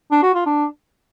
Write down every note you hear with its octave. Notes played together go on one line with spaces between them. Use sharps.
D4
F#4
F4
D4